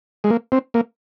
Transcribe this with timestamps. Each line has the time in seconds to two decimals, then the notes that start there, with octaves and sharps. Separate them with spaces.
0.24 G#3
0.30 A#3
0.52 C4
0.74 A#3